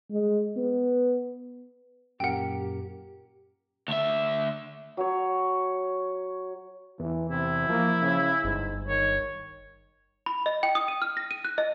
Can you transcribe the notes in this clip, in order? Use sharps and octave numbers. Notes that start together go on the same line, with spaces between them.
G#3
B3
F#2 A#2 G4 A#4 F#5 G5
D2 E5
F#3 C#5
E2 E3
C3 E4
F3 A#3
C#3
G1 G#2
D#3 C#5
B5
D#5
G5
D#6
D#7
F6
A#6
D#7
F#6
D#5